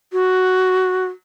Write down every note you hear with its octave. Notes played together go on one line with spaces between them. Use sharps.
F#4